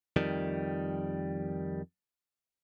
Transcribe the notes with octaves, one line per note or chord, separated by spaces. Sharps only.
F2 D#3 G3